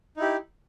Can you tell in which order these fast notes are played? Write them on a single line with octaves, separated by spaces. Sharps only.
D#4 E4 G4